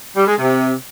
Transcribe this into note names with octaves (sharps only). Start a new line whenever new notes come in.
G3
G#3
C3